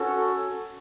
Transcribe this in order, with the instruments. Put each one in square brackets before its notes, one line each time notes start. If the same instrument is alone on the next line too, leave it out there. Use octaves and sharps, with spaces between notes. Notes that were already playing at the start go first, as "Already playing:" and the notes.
Already playing: [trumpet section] C#4 F#4 A4